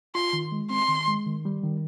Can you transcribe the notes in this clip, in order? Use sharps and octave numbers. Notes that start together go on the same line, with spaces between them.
F4 C6
D#3
G#3
C4 C6
D#3
G#3
D#3
G3
D#3